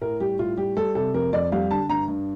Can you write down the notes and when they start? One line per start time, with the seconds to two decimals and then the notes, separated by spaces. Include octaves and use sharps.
0.01 A2 A#4
0.20 G3 G4
0.39 A2 F4
0.57 G3 G4
0.77 G3 A4
0.95 C3 A4
1.14 F2 A#4
1.33 F2 D5
1.52 G3 F5
1.71 D3 A5
1.89 G2 A#5
2.08 G2